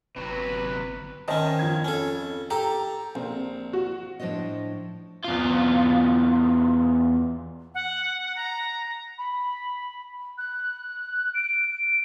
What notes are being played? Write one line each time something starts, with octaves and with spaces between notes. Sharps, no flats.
G1 C3 F#3 B4
D#3 C#4 C5 D#5 A5
F2 G#6
C#4 A4
G4 A4 A#5
A#1 C4
F#4
A2 F3 D4 C5 C#5 D#5
E2 F4
F#5
A#5
B5
F#6
D7